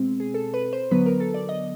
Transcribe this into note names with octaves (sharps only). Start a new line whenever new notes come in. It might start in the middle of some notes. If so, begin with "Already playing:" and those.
Already playing: B2 G#3 C4
G#4
A4
B4
C5
D3 F#3 B3 B4
A#4
A4
D5
D#5